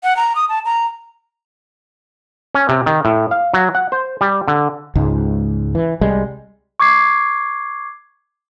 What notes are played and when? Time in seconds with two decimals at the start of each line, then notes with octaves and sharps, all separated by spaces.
0.04 F#5
0.17 A#5
0.36 D#6
0.49 A5
0.65 A#5
2.55 C#4
2.69 C3
2.86 D#3
3.05 A2
3.31 F5
3.54 F#3
3.75 F#5
3.92 C5
4.21 G3
4.48 D3
4.95 C#2 G#2
5.75 E3
6.01 C2 G3 G#3
6.80 C#6 D6 G#6 C7